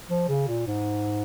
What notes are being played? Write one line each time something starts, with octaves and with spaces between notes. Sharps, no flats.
F3
C#3
A#2
G#2